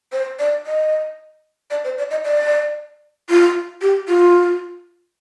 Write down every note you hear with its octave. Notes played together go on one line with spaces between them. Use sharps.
C5
D5
D#5
D5
C5
D5
D#5
D5
F4
G4
F4